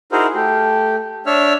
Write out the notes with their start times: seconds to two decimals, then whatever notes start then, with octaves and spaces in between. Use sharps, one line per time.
0.12 D#4 E4 F#4 G#4 A#4 C5
0.35 A3 G4
1.26 D4 C#5 E5 F6